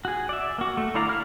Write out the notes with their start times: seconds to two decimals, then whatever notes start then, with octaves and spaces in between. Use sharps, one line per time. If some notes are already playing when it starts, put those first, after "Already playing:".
0.05 F#4 G#4
0.29 D5 E5
0.58 A#3 F#4
0.77 A3
0.94 D3 E4 D5 F5 A#5
1.09 E4 F5 F6